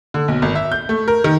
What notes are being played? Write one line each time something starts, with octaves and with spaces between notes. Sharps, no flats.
D3
B1
G#1
E5
G6
A3
A#4
D#3